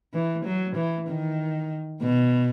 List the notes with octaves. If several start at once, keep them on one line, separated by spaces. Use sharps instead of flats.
E3
F#3
E3
D#3
B2